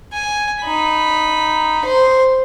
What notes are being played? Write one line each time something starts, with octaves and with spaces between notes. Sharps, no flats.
G#5
D#4 B5
C5